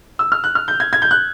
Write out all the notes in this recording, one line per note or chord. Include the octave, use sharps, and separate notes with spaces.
E6
F6
F#6
F6
G6
G#6
G#6
G6
F#6